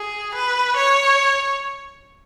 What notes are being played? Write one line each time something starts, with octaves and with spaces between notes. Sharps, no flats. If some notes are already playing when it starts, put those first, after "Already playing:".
Already playing: G#4
B4
C#5